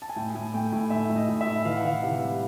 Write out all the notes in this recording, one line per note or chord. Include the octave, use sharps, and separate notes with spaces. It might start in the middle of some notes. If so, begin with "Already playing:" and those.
A5
G#5
A2 G5
A2 G#5
A3 G5
A2 G#5
A3 E5
A2
D#5
A2
E5
A2
E3 F5
F#5
E3 F5
C3
G3